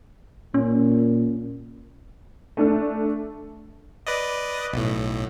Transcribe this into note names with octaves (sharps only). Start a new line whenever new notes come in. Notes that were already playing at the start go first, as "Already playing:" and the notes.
A#2 C#4
A3 D4 A4
B4 D5 D#5
B1 A2